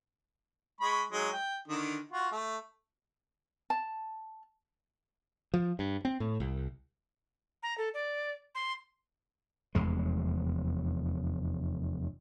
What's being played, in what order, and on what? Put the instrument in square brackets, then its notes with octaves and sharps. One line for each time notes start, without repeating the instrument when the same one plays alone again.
[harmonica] G#3 B5 C#6
F#3 G#3 D#4
G5
D3 D#3
F4 F#4
A3
[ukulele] A5
[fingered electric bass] F3
G2
C4
A2
C2
[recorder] A#5
A4
D5
C6
[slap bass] F1 E2 G#3